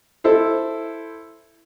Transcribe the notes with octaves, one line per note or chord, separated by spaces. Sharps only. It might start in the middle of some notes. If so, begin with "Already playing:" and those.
E4 A4 C5